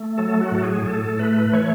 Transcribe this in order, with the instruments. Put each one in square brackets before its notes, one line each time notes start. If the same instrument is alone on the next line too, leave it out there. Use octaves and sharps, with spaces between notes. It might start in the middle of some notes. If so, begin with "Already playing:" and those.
Already playing: [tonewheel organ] A3
F#3 A4
F#4
A2 A4
G#4
A2 A4
A3 B4
E3 C#5